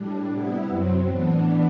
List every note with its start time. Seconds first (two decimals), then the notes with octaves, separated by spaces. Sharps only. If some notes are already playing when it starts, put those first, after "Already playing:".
Already playing: A2 G3 D4
0.28 C3 G3 B3 E4
0.68 F#2 F#3 C4
1.07 A2 E3 B3 D4